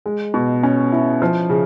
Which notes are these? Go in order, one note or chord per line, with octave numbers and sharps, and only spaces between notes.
G#3
B2
C#4
E4
F3
C#3